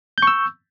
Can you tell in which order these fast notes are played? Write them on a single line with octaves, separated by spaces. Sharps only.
G6 C#6 E6